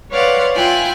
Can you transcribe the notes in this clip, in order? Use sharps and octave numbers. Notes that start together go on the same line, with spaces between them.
B4 C#5 D5 F5 F#5 C6
E4 F4 G5 G#5 F#6